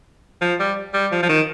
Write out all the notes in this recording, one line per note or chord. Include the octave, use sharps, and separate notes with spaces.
F3
G3
G3
F3
F3
D#3